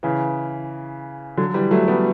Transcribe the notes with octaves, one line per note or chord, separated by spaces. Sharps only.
C#3 E3
D3 F#3
E3 G3
F#3 A3
G3 B3